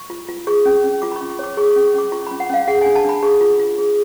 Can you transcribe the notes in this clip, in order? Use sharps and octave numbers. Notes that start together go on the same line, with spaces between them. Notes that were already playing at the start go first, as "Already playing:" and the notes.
Already playing: C#6
F4
F4
G#4 C#6
C#4
C#4
F4 D6
B5
C#4 C#6
C#6
C#5 D6
G#4 C#6
C#6
C#4
C#6
C#4 D6
F4 C#6
C#4 B5
F#5
C#4 F5
G#4 F#5
D4 G#5
A5
D4 B5
G#4 C#6
F4
F4
G#4